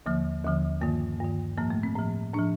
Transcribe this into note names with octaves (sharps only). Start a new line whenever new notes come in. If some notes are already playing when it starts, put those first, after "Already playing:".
D#2 D3 F3 A#3
D#2 D3 F3
G2 D#3 A#3
G2 D#3
A2 F3 A#3
A3
C4
A2 F3
A2 F3 D4